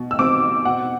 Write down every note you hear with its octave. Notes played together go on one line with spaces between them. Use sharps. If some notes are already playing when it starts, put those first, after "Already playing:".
Already playing: B2
E6
C4 D6
B2 F#5